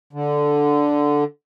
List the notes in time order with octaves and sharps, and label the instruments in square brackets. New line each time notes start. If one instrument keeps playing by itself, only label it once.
[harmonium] D3